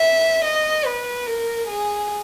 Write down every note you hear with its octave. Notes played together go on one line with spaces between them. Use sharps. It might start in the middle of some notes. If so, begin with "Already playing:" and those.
Already playing: E5
D#5
B4
A#4
G#4